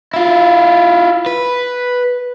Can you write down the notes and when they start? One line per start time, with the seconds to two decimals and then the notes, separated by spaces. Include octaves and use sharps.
0.14 E4 F4
1.26 B4